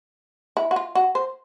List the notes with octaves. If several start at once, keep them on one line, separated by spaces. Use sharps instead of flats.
E4
F#4
F4
F#4
C5